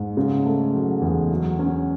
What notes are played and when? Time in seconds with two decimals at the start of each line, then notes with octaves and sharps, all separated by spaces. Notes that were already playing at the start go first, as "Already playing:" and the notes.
Already playing: G#2
0.17 C#3
0.45 A3
0.74 F#3
1.02 E2
1.31 F#3
1.59 C#4